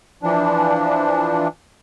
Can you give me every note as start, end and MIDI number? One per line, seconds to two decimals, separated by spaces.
0.23 1.48 52
0.23 1.48 53
0.23 1.48 62